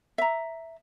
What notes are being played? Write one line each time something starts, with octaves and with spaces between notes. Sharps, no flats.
E5 A#5